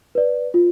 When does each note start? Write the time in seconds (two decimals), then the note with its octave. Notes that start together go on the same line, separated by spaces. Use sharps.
0.15 B4 D5
0.54 F4